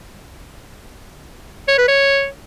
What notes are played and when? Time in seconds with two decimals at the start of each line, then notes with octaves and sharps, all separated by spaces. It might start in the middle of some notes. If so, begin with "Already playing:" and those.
1.68 C#5
1.78 B4
1.88 C#5